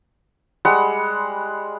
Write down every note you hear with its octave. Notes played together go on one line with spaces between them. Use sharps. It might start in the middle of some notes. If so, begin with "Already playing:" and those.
G3 G#3 F#5